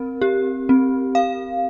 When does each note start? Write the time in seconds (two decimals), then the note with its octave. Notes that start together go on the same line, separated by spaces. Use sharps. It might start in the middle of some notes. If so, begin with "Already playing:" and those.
Already playing: C4 A#4
0.22 G4
0.69 C4
1.15 F5